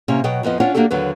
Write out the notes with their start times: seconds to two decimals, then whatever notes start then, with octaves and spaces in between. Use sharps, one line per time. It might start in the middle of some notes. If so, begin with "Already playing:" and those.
0.08 C3 A#3 C#4
0.24 B2 F#3 D#5 G5
0.43 F2 F3 B3 D#5
0.60 C#4 D4 F4 C#5 F#5
0.75 A#3 D4 F#4 G4 A4
0.91 D#2 D3 F#3 B4